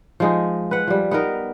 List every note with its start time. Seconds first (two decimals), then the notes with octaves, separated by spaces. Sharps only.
0.20 F3 G#3 D#4
0.71 B4 F#5
0.87 F3 G3
1.11 B3 D#4 A#4